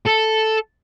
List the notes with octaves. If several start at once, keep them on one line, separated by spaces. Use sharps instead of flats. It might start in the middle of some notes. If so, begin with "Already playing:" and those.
A4